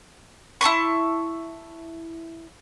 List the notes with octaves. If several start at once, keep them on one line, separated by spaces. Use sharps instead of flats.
E4 A5 C6 C#6